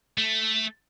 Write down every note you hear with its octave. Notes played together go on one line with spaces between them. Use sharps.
A3